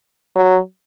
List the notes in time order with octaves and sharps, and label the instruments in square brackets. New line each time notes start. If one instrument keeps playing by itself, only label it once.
[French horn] F#3